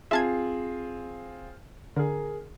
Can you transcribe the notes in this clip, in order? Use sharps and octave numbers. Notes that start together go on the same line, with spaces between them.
C4 F4 G#4 E5 A5 G#6
D3 G#4 A#4